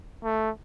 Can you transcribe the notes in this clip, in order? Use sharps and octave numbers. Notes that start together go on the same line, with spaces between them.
A3